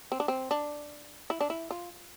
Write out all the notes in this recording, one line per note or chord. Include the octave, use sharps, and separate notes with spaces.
C4
D4
C4
D4
E4
D4
E4
F4